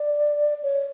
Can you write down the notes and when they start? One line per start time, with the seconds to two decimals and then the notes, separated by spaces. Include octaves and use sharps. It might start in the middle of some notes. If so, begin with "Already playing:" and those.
Already playing: D5
0.63 C#5